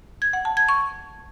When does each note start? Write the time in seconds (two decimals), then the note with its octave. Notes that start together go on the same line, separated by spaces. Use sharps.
0.22 G#6
0.33 F#5
0.45 A5
0.57 G#6
0.69 C#6